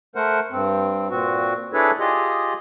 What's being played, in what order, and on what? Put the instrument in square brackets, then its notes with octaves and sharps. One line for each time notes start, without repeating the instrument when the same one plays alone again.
[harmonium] A3 A#4 C5 F#5
G2 C4
A#2 C4 F#4
D4 E4 G#4 A4 B4 C#5
F4 G4 G#4 D#5